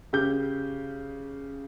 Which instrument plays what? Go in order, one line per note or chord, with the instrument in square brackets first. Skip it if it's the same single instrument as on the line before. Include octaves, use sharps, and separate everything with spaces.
[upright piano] C#3 G4 G6